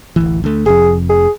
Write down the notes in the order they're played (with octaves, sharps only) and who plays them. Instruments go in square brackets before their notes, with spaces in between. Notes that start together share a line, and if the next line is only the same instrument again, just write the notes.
[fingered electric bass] D1 A1 E3
D2 A3
[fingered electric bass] F1 F2 [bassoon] G#4
[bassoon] G#4